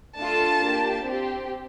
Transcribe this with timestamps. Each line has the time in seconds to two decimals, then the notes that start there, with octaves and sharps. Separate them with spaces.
0.16 A3 D4 F4 A4 A5
0.61 A#3 D4 G4
1.04 C4 G4